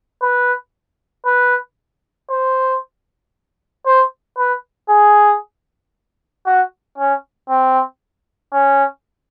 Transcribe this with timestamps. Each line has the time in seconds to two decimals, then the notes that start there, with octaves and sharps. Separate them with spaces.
0.22 B4
1.26 B4
2.30 C5
3.86 C5
4.38 B4
4.89 G#4
6.46 F#4
6.98 C#4
7.50 C4
8.53 C#4